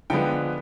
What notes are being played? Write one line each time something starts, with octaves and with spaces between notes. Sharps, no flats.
D3 F3 G#3 B3 G5